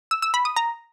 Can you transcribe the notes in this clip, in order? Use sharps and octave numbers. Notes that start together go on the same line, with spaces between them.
E6
E6
B5
D#6
A#5